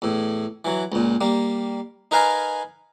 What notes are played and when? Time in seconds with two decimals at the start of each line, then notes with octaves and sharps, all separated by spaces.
0.02 E2 A2
0.65 E3 F#3
0.92 C#2 A#2
1.21 G3 A#3
2.11 D#4 A#4 B4 F5 G#5 A#5